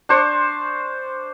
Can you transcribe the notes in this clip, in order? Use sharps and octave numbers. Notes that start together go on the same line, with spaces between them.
D4 C5 C#6